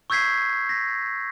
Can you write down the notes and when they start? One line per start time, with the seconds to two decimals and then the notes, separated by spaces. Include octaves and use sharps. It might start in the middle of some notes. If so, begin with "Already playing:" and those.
0.10 C#6 E6 G6 G#6 B6 C7
0.69 A#6 B6